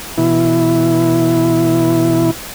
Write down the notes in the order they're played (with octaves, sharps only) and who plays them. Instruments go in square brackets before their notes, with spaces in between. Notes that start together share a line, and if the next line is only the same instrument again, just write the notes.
[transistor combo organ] B2 E3 E4